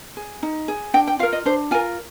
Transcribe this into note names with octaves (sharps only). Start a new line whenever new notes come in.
G#4
D#4
G#4
D4 G5
G5
F4 A#4 F5
D#5
D4 C5
F4 A#4 G#5